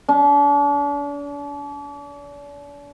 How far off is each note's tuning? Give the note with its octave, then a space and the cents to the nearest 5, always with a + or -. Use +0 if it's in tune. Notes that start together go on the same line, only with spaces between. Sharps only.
D4 -40